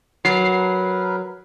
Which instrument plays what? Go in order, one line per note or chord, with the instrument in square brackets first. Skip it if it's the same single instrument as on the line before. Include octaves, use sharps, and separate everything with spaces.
[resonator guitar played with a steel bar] F#3 [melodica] A#4 B4 [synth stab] C7